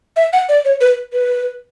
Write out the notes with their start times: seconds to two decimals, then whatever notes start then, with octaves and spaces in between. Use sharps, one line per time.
0.17 E5
0.33 F#5
0.49 D5
0.65 C#5
0.81 B4
1.13 B4